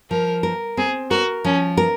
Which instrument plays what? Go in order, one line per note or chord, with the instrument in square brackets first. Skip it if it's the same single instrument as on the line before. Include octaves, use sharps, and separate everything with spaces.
[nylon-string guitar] F3 [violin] A#4
[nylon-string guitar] A#4
[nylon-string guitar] C4 [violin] G#4
[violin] F#4 [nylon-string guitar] A#4
[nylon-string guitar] F3 [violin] C#4
[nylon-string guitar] A#4